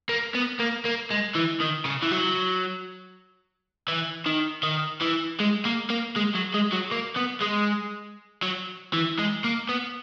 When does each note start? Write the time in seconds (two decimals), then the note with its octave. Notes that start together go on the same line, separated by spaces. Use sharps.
0.09 A#3
0.35 B3
0.59 A#3
0.85 A#3
1.10 G#3
1.35 E3
1.60 D#3
1.85 C#3
2.02 E3
2.12 F#3
3.88 E3
4.26 D#3
4.63 D#3
5.02 E3
5.40 G#3
5.65 A#3
5.90 A#3
6.16 G#3
6.35 F#3
6.54 G#3
6.72 F#3
6.91 A#3
7.17 B3
7.42 G#3
8.43 F#3
8.93 E3
9.19 G#3
9.44 A#3
9.69 B3